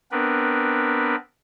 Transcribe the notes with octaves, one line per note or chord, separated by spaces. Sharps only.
B3 C4 D4 A#4 B4